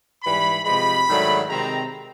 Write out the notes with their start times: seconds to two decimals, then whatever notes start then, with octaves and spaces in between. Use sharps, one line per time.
0.23 G#2 E3 G3 B5
0.65 C3 F3 G#3 B5
1.08 G#2 D#3 F#3 A3 D4
1.49 C3 D#3 G#3 C4 A#5